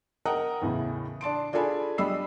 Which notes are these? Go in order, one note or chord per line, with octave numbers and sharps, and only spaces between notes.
A#4 D#5 F#5 G5 A#5 D#6
E2 A2 C#3
D4 A5 C6 D7
D4 F4 G#4 A4 G#5 B5
G3 D4 D#5 B5 E6 C7